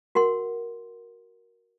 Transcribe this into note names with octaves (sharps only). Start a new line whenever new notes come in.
F#4 A#4 F#5 C6